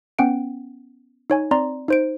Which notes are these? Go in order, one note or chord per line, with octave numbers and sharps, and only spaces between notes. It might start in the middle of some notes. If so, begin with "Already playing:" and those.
B3 C#4 F#5 G5 D7
D#4 C#5 G#5
C4 D5 A#5 C6
D#4 C5 D7